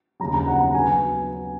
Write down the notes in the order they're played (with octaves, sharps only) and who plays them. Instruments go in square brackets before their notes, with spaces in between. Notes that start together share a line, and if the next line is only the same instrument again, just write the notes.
[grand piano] D#2 C#3 F#3 [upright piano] A#5
[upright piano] A#5
F#5
A#5
[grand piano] F#3 B3 F#4 [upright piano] G#5